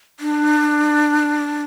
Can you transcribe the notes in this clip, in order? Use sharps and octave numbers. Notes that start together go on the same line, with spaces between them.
D4